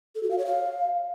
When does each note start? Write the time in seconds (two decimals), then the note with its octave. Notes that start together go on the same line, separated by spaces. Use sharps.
0.15 A4
0.23 F#4
0.31 F5
0.38 C#5
0.46 F5